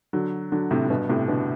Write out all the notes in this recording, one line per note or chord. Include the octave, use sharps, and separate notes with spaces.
D3 F#3
D3 F#3
A2 C3
A2
G2 B2
A2 C3
B2 D3